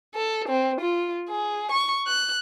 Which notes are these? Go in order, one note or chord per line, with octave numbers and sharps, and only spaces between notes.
A4
C4
F4
G#4
C#6
F#6